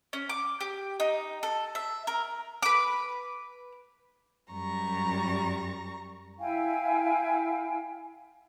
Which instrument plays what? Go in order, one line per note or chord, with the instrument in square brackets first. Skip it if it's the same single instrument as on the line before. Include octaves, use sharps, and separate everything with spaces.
[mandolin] C#4
D6
G4
D#4
A4
E5
A#4
B4 D6
[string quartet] F#2 G3 A#5 C#6 A#6
[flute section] E4 F5 G5 G#5